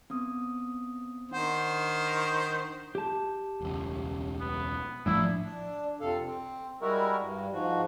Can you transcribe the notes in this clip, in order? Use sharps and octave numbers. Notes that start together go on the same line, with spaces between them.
B3 C4 D#6
D#3 D4 C5 F#5 G6
G4 A5
E1 C#2
B3
A#1 A2 F3 D4 E4
D4
F2 C3 A4 F5
C4
G3 G#3 E4 F#4 A#4
G2
G#2 F3 F#4